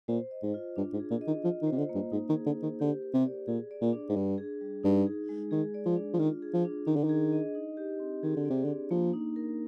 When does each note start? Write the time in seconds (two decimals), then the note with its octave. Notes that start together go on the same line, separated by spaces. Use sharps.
0.08 A#2 C5
0.31 D#5
0.43 G#2
0.54 F4
0.76 G2 D4
0.93 G#2
1.00 G#4
1.11 A#2
1.21 D#5
1.27 D#3
1.44 F3 F4
1.62 D#3
1.67 C5
1.72 C3
1.78 D3
1.89 A#3
1.95 G2
2.12 G#2 D#4
2.29 D#3
2.35 G#4
2.46 D3
2.57 C5
2.62 D#3
2.80 D3 G4
3.03 A#4
3.14 C3
3.25 D5
3.47 A#2 G#4
3.71 D5
3.81 A#2
3.93 D4
4.09 G#2
4.15 G2 D4
4.38 G#4
4.61 G3
4.83 G2 D#4
5.07 G#4
5.29 G#3
5.51 D#3 G#4
5.74 D5
5.86 F3
5.96 D4
6.13 F3
6.19 D#3 F4
6.42 G#4
6.54 F3
6.65 D4
6.86 D#3 D4
6.96 D3
7.04 D#3
7.09 G#4
7.32 D#5
7.55 D#4
7.77 G4
8.00 C4
8.23 D#3 G#4
8.36 D3
8.45 C3 D5
8.64 D3
8.68 D4
8.91 F3 A#3
9.13 D#4
9.36 A#4